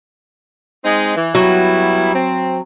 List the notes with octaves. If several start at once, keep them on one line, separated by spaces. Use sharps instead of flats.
G#3 C4 D#4
E3
F#3 G3 B3 E4
C4